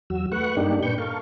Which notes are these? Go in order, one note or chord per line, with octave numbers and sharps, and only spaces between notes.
E2 F#3 F#4 E6
A3 B4 F#5 C#6 F#6
G2 A#3 D4 D#4 G4
A#2 D4 B4 C#6 G6
A4 A#4 F5 C#6